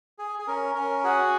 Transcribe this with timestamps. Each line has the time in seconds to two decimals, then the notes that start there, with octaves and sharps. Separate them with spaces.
0.19 G#4
0.39 G#4
0.47 C#4 A#4
0.75 C#4 A#4
1.04 F#4 G#4